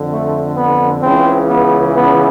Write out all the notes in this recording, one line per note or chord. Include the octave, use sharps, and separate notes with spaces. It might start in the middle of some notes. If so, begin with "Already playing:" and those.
Already playing: F2 D3
A3
B3
C#2 C#3 E3 C4
B3
B3